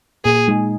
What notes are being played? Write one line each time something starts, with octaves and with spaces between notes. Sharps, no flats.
A#2 G#4
G#3 D#4 G#4